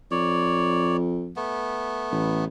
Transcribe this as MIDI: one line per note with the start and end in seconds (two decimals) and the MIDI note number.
0.11 1.35 41
0.11 0.97 73
0.11 0.97 74
1.36 2.45 57
1.36 2.45 59
2.12 2.47 33